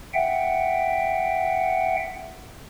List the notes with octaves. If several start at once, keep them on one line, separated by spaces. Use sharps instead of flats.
E5 F#5 G5